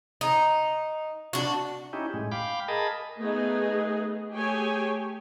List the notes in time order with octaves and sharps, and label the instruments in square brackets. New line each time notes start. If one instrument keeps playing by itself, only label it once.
[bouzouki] D#4
D4 F#4
[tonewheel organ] C#4 D#4 E4 G4
A2 G#3
F5 G5 B5 D6
G#4 A#4 D#5 A5 B5
[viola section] A3 B3 D#4 G#4 D#5
A3 G4 G#4 C#5 G5 G#5